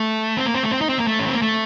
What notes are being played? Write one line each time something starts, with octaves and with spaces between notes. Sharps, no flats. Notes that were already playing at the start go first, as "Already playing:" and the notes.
Already playing: A3
C4
A#3
C4
A3
C4
D#4
C4
A#3
A3
C#4
C4
A#3
A3